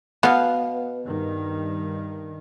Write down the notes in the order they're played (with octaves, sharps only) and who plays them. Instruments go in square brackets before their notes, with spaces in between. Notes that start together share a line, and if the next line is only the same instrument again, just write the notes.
[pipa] B2 F5 [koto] B3
[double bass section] G2 D#3